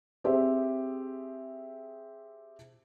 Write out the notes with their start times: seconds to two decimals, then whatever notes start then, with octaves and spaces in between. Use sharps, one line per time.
0.24 C4 G4 G#4 C5 E5